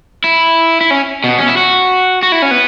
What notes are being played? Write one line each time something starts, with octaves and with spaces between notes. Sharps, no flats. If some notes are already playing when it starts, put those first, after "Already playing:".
E4
E4
C#4
B2
C#4
E4
F#4
F#4
E4
C#4
B3